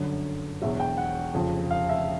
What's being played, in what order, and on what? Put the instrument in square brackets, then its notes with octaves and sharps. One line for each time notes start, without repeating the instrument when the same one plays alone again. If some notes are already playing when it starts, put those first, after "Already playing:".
Already playing: [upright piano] G1 F#2 D3
E1 E2 B2 F#3 E5
G5
F#5
F1 F2 C#3 F3
F5
E5